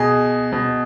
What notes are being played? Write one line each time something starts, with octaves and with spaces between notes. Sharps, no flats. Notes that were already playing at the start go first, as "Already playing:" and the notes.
Already playing: B2 G#4
B2